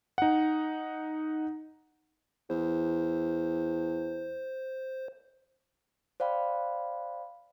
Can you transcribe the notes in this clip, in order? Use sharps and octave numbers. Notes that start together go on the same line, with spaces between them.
D#4 F#5
E2 C5
C5 D5 F5 G5 B5